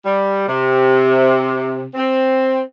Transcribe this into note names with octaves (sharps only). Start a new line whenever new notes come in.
G3
C3
C4